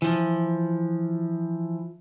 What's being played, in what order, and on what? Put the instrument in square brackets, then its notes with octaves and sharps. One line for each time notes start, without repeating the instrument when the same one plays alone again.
[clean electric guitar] E3 F3